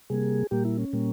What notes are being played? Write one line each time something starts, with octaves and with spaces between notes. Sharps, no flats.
C3 G3 A#3 G#4
A#2 G3 A#3 G4
E4
C#4
A#2 G3 A#3